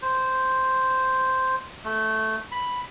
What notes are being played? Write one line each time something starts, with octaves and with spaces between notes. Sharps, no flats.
C5
A3
B5